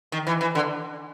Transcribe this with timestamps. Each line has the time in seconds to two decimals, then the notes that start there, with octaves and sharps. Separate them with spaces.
0.12 D#3
0.27 E3
0.41 E3
0.55 D3